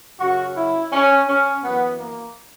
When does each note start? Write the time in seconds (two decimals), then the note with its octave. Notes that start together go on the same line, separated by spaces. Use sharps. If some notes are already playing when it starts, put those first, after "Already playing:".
0.20 F#2 C#3 F#3 F#4
0.57 E4
0.92 C#4
1.28 C#4
1.64 F#2 E3 B3
1.99 A#3